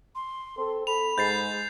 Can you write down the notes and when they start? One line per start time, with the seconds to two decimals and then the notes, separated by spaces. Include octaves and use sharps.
0.15 C6
0.57 C4 A4
0.87 A4 B5 F7
1.18 G#2 G#3 G6 A6 C7